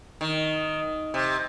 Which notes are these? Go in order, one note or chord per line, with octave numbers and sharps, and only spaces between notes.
D#3
C3